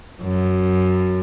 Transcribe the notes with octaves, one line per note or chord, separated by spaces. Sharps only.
F#2